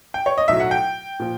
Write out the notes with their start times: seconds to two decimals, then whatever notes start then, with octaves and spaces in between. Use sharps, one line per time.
0.14 G5
0.26 C#5
0.38 D#5
0.48 B1 A2 F#3 E5
0.60 F#5
0.71 G5
1.20 A#2 F3